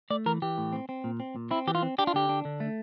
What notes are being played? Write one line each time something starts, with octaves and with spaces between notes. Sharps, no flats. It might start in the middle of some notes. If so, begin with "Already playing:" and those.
A3 D5
E3 A#4
E3 G4
A2
C4
C4
A#2
C4
A#2
C4 E4
E3 G4
F4
C4
D4 G4
F4
D3 G4
D4
D3
A3